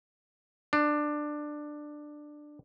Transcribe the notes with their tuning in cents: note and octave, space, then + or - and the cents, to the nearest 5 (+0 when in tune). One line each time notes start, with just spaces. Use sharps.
D4 +15